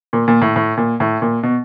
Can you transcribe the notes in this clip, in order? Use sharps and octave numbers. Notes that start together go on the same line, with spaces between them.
A#2
A#2
A2
A2
A#2
A2
A#2
B2